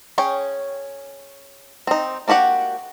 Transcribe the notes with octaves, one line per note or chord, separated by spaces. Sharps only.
C#4 G#4 C#5 G5
C4 D#4
A#3 D4 F#4 G4 F#5